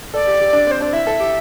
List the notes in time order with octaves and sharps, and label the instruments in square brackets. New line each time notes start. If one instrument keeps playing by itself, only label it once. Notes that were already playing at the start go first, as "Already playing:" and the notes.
[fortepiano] A4 [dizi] D5
[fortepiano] G4
G4
D4
[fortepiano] C4 [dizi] C5
[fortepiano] D4 [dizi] D5
[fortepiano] E4 [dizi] E5
[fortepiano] A4
G4